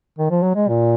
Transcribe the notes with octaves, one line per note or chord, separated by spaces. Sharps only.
D#3
F3
F#3
G#3
A#2